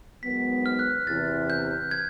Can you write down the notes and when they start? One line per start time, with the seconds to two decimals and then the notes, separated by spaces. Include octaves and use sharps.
0.23 G#2 D#3 F#3 B3 B6
0.66 F6
0.79 F#6
1.07 E2 C3 E3 A6
1.50 G6
1.91 G#6